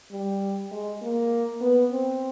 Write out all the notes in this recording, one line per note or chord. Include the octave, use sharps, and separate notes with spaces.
G3
G#3
A#3
B3
C4